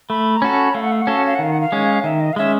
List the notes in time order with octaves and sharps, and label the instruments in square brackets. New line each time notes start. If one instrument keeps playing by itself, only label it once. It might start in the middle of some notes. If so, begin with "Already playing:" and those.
[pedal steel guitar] A3 [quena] B5
[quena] A#5
[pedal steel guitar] C#4 F#4 A4 [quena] B5
[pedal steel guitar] A3 [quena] F5
[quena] F#5
F5
F#5
[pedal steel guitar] C#4 F#4 A4 [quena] F5
[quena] F#5
F5
F#5
[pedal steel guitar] D#3 [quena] F5
[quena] F#5
F5
[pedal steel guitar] G#3 C#4
[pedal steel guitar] D#3 [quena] E5
[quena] D#5
F5
[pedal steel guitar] G#3 C#4 [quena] E5